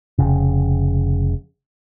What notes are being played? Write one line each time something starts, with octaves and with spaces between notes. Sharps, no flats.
F1 C#3